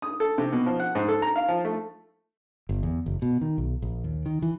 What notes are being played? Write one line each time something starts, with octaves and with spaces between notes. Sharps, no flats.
D#6
A4
C3
B2
F3
F#5
G#2
A4
A#5
F5
F3
A3
G1
E2
F#1
B2
D#3
B1
A#1
D#2
D#3
E3